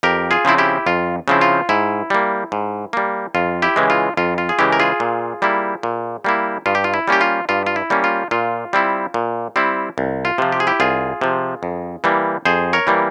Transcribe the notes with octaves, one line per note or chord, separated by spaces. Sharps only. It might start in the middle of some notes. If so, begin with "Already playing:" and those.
F2 G4 A#4
F4 G#4
C#3 F3 C4 E4
E4 G4
F2 F4
C#3 F3 C4 E4
F4
G#2 E4
G3 A#3
G#2
G3 A#3
F2 F4
E4 G4
C#3 E3 G#3
F4
F2 F4
F4
G#4
C#3 E3 G#3 E4 G4
A#4
F4 G#4
A#2
G3 A#3 E4
A#2
G3 A#3 E4
G2 F4
G4
F4
E4
G3 A#3 C#4 G4
F4
G2 F4
F4
E4
G3 A#3 C#4
F4
A#2 F4
G3 C4 E4
A#2
G3 C4 E4
C2
F4
C3 F3
G4
G#4
E4 G4
C2 F4 G#4
C3 F3
F2
E3 G3 A#3
F2 G#4 C5
A#4 C#5
E3 G3 A#3